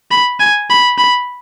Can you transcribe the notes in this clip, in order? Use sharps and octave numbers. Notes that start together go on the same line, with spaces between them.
B5
G#5
B5
B5